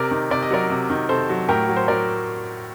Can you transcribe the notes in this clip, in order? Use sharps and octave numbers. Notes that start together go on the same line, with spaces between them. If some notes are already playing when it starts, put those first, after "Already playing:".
Already playing: C3 A#4 D5
D#3
C3 D5
D#5
F#3 A#4 D5
C3
D#3
C3 A4 C5
F#3
A2 G4 A#4
F#3
C5
F#3 A#4 D5